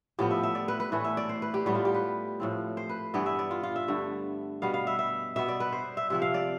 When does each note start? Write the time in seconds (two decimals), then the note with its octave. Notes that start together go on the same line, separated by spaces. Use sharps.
0.19 A2 F3 B3 G4
0.31 E5
0.43 E5
0.55 D5
0.68 B4
0.80 B4
0.92 A2 E3 A3 B4
1.04 E5
1.17 D5
1.29 C5
1.42 B4
1.54 G4
1.66 A2 G3 B3 G4
1.75 F4
1.85 G4
1.94 B4
2.40 A2 F3 C4
2.77 C5
2.89 B4
3.14 G2 E3 B3 D5
3.26 E5
3.39 D5
3.51 F4
3.63 F4
3.76 E5
3.88 G2 D3 A3
4.62 B2 G3 B3 F5
4.74 F5
4.87 E5
4.99 E5
5.36 B2 B3 E5
5.48 D5
5.60 B4
5.73 C5
5.97 E5
6.10 C3 F3 C4 E5
6.22 F5
6.34 D5